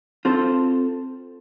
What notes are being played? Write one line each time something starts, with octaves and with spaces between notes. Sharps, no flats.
C4 F4 A4 C5